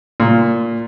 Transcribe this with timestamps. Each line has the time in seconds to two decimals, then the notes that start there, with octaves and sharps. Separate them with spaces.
0.20 A#2